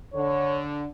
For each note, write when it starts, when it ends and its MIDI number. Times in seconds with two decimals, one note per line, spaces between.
0.14 0.85 50
0.14 0.62 73